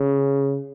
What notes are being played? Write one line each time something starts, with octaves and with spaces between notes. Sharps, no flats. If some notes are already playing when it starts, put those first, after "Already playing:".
Already playing: C#3